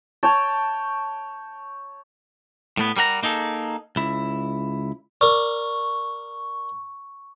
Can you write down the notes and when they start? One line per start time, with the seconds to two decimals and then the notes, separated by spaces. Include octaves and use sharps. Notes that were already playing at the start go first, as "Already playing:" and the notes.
0.23 C#5 G5 A5
2.77 A2 A3 B3
2.97 G3 A#4 F#5 A#5
3.23 A#3 D#4 G#4 A4
3.96 C#2 E4
5.21 A#4 D5 C#6